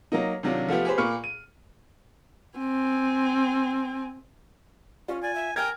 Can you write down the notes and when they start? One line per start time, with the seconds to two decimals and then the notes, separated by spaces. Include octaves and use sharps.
0.12 F#3 A#3 D#4
0.43 C3 D#3 F#3 D4 F4
0.68 F3 A3 B3 F4 G4
0.85 G4 G#4 B4 C5
0.98 A#2 A#3 B5 C#6 F6 C#7
1.24 D#7
2.58 C4 G#5
5.08 C#4 F4
5.22 D5 G#5
5.35 E5
5.56 A#4 G5 G#5 F6 G#6